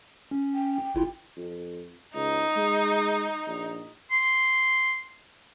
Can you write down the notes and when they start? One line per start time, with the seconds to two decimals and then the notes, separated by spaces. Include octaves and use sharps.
0.31 C#4
0.54 G5
0.95 G1 E4 F4
1.37 F2
2.15 C#2 D#4
2.57 G#3
3.47 A#1
4.11 C6